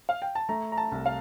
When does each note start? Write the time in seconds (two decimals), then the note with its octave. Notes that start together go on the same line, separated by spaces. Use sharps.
0.09 F5
0.22 G5
0.35 A5
0.49 A3 A#5
0.72 A#5
0.77 A5
0.92 C2
1.06 F5